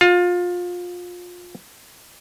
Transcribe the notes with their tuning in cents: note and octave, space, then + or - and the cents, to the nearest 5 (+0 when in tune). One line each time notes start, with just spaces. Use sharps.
F4 +25